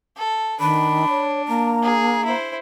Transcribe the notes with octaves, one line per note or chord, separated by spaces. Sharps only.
A4
D#3 D4 B5
C#5
A#3 A#5
G#4
E4 C5